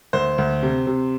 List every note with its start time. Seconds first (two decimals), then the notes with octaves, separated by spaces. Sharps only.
0.13 D2 C5
0.38 D2
0.63 C3
0.87 C3